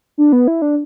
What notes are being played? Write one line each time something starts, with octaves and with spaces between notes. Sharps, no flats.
D4
B3
E4
D4